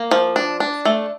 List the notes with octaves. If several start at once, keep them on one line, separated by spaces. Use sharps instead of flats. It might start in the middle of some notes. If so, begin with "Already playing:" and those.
Already playing: A#3
F3
D4
D4
A3